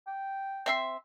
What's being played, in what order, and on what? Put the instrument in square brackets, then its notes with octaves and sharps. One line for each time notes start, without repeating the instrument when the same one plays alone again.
[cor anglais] G5
[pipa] C4 E5 C6